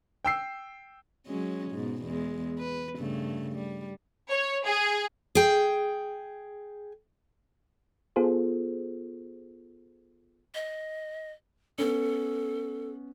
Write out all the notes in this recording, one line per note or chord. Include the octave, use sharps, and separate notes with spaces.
G5 E6 C7
F#3 G#3 C#4
G#2 B2
E2 G#3
B4
G2 C#3 A3
G3
C#5
G#4
G#4 G5
B3 F4 G#4 A4 C5
D#5
B3 C#4 A4